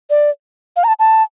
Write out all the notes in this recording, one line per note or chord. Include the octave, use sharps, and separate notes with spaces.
D5
F5
A#5
A5
A5